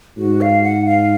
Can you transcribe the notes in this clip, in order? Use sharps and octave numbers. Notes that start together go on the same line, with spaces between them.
G#2 F#4
F5
F#5
F5